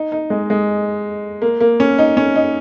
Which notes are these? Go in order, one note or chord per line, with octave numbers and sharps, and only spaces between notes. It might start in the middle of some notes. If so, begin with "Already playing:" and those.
Already playing: D#4
D#4
G#3
G#3
A#3
A#3
C#4
D#4
C#4
D#4